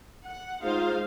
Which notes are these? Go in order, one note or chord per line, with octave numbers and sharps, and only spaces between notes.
F#5
G#3 D#4 F4 C5 F5